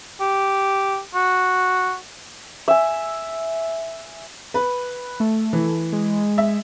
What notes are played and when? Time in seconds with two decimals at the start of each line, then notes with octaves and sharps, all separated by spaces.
0.20 G4
1.15 F#4
2.68 E5 G#5
4.54 B4
5.20 A3
5.53 E3
5.93 G#3
6.38 E5